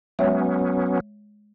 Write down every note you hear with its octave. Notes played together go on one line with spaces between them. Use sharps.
F#3 G#3 B3 C#4 C#5 E5